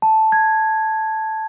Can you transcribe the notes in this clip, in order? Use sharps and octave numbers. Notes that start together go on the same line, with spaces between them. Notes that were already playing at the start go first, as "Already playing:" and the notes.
A5
G#6